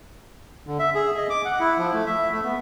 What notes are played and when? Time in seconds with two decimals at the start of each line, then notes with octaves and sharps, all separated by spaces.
0.67 D3
0.79 E5
0.95 G#4
1.17 D#5
1.30 D6
1.45 F#5
1.60 E4
1.78 F3
1.93 A3
2.06 E5
2.31 A3
2.44 B3